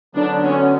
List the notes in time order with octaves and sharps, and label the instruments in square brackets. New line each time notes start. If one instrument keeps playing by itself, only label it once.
[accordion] D3 F#3 B3 [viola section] D4
[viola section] C#4